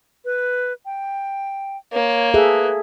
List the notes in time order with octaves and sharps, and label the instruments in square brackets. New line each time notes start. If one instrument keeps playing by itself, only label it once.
[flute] B4
G5
[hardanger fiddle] A#3 [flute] C#5
[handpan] G#4 A4 E5 [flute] B4